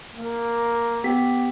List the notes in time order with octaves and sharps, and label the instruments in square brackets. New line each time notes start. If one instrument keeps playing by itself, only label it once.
[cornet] A#3
[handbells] B3 G4 B6